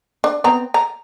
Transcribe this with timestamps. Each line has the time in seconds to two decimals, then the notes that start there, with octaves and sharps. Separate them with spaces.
0.24 D4
0.44 B3 C4 A#5
0.74 A#5